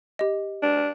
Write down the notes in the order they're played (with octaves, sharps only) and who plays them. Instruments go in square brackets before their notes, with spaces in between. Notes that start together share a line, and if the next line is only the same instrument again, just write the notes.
[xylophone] G4 D#5
[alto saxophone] D4